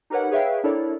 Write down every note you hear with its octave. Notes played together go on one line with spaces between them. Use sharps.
D#4 G4 A#4 B4 C#5 F#5
G#4 B4 C#5 E5 F5 G5
D4 E4 A4 A#4 C#5 D5